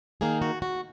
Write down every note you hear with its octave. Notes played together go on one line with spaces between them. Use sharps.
D#3 A#3 D#4 G#4
F#4
F#4